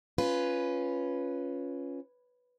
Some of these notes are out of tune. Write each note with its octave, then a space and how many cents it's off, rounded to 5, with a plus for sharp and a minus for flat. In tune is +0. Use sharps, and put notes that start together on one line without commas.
C#4 +0 F4 -5 B4 +0